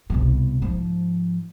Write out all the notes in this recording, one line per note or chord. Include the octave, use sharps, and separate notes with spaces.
C2 B2
G#2 F3